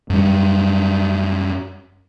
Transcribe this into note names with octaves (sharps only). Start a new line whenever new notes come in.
F#2 G3